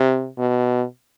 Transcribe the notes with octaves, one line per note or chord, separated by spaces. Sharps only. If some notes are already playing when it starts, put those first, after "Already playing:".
Already playing: C3
B2